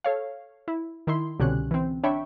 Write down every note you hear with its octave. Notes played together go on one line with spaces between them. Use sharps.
A4 C#5 F5
E4
D#3 E4 C6
C2 B2 D3 C#4 G4 F#6
E3 C4
D4 C#5 E5 G5 B5 C#6